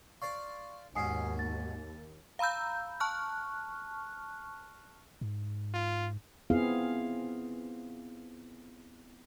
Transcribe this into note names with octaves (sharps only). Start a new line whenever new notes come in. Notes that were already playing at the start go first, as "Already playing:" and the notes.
C5 D5 F5 C#6
D#2 G#2 B2 C#4 G#5 D#6 C7
A6
F5 A#5 B5 E6 G6
A5 C#6 F6 F#6
G#2
F4
B3 C4 E4 F4 G#4 F5